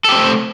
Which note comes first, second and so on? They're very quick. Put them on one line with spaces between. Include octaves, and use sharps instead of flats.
A4 G4 C4 A3